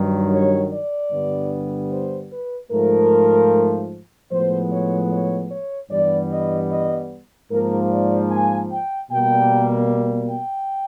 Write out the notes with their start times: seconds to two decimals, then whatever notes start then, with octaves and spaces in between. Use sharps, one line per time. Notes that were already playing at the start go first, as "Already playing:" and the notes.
Already playing: G2 D#3 F#3
0.32 C#5
0.72 D5
1.12 G2 D3 G3 B3
1.91 C5
2.32 B4
2.71 G#2 F3 A3 A#4
4.31 A2 F3 G#3 B3 C5
4.71 C#5
5.11 C#5
5.51 C#5
5.91 G2 E3 G3 B3 D5
6.31 D#5
6.71 D#5
7.51 G#2 F3 A#3 A#4
7.91 D5
8.31 G#5
8.71 G5
9.11 B2 G3 A#3 G5
10.30 G5